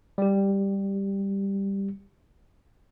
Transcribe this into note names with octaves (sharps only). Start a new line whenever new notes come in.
G3 G4